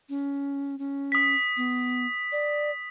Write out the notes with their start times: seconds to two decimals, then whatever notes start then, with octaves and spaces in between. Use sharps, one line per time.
0.09 C#4
0.79 C#4
1.12 D#6 B6
1.57 B3
2.32 D5